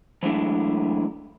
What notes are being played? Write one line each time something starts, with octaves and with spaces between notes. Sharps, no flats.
E3 F#3 G#3 A3 D4 E4